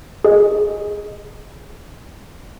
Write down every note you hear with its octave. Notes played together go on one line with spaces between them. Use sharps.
G#4 D#5